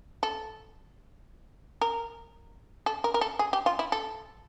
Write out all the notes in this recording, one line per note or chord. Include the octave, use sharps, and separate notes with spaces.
A4
A#4
A4
A#4
A#4
A4
G#4
G4
F4
E4
A4